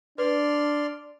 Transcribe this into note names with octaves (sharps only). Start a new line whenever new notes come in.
D4 B4 D5 C6 F6